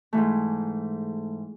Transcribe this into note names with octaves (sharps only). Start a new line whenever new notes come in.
G#2 E3 A3